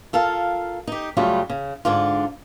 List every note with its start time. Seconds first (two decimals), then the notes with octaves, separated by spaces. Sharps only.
0.13 F4 A4 A#4 F5
0.87 D#4 G4
1.17 F#2 C#3 F#3 G3 A3 F4
1.50 C#3
1.85 G#2 D3 D4 F4